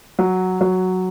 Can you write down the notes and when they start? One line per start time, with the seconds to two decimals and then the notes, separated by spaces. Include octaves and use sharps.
0.19 F#3
0.61 F#3